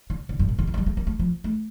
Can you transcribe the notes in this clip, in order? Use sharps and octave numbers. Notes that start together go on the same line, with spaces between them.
D3
D3
G2
A#2
D3
D#3
F3
G3
A3
A#3
A3
F3
A3